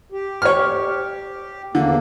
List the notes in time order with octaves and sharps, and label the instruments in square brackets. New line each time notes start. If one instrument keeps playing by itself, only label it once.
[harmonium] G4
[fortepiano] C#5 F6
[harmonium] E2 A#3 [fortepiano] D3